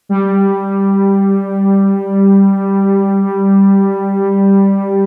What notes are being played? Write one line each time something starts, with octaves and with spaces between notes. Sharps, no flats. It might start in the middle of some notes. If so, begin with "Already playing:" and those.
G3